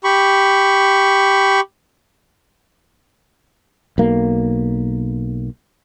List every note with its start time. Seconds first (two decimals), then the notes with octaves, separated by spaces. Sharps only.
0.04 G4 B5 C#6
3.98 B1 A#3